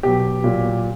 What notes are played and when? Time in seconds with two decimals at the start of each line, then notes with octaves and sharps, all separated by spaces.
0.03 B2 F#3 G4
0.44 A#2 F#3